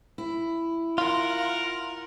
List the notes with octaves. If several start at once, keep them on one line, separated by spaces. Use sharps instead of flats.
E4
F4 A#4 F#5